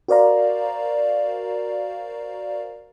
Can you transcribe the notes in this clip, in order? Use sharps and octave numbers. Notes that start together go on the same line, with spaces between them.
F#4 A#4 C5 D5 F5 A#5